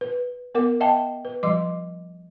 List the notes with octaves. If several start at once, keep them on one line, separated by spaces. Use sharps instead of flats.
B4
B3 A#4 F#5 D6
D#5 E5 F#5 G5 A5
B4
F3 G3 D#5 C6 D6